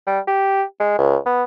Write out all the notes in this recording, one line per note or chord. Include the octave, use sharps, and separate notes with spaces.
G3
G4
G#3
C#2
B3